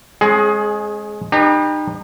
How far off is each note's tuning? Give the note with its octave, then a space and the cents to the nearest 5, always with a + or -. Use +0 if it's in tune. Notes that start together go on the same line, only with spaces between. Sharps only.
G#3 +0 C#4 -45 G#4 +20
D#4 -35 G4 +25 B4 -25